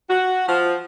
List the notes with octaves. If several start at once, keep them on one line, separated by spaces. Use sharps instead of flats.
F#4
F3